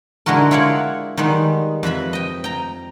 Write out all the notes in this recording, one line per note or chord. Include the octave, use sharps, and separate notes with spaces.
D3 G#3 E4 F#4 A#4
E4 F4 C#5 D5 F#5
D#3 G3 G#3 B3
F2 B4 E5 B5
D#5 G5
G5 A#5